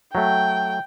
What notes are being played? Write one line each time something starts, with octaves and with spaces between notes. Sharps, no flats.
F#3 A3 G5